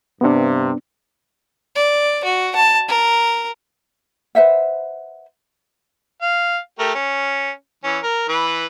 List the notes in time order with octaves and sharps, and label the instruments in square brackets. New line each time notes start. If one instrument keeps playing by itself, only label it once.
[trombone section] G2 C3 [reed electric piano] B3 D4
[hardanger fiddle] D5
F#4
A5
A#4
[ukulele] B4 C5 E5 F#5
[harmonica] F5
A3 G4 A#4
C#4
E3 C#4
A#4
E3 B4